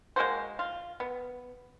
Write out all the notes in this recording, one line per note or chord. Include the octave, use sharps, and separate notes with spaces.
G#3 A#3 F#4 C5
F4
B3